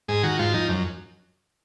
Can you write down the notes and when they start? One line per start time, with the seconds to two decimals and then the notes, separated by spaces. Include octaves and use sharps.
0.08 G#2 G#4
0.23 D#3 F#4
0.39 G#2 F4
0.54 F3 D#4
0.68 F#2